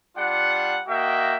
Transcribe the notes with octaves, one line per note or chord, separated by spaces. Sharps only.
G3 D4 F4 F#5
A#3 F#4 D#5 E5 G5